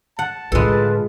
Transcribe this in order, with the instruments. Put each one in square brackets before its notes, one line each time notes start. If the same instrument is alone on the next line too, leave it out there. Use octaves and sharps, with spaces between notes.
[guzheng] F#5 [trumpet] A5
[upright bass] A2 D3 [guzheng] G#3 A4 [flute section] F4 B4